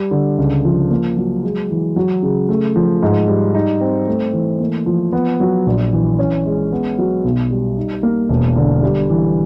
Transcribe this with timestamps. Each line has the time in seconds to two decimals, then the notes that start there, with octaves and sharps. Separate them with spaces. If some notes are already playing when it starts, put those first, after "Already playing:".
Already playing: G3
0.11 D3
0.38 C#2
0.65 F3
0.91 A#3
1.17 F#3
1.44 G#3
1.71 E3
1.96 F#3
2.23 C#3
2.49 A3
2.76 F3
3.03 G#2
3.28 G3
3.55 D#4
3.81 C4
4.08 A3
4.33 E3
4.60 A#3
4.86 F3
5.13 B3
5.40 F#3
5.67 A#1
5.93 E3
6.19 C#4
6.46 G#3
6.72 B3
6.98 F#3
7.25 B1
7.51 G3
7.78 D#4
8.03 A#3
8.29 E1
8.56 D3
8.83 G3
9.10 E3